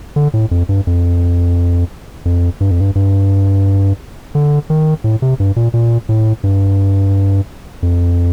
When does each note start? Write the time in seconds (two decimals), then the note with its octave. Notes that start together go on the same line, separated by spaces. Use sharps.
0.16 D3
0.34 A2
0.51 F2
0.69 G2
0.87 F2
2.25 F2
2.61 G2
2.71 F2
2.81 G2
2.95 G2
4.35 D3
4.70 D#3
5.04 A2
5.22 C3
5.40 G2
5.56 A#2
5.74 A#2
6.09 A2
6.44 G2
7.83 F2